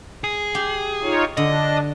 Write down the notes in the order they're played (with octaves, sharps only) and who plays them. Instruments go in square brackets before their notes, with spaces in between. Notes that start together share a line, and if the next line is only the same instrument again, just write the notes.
[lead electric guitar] G#4
[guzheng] G4
[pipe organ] D#4 F4 C#5
[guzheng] D3 [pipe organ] D4 [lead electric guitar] D#5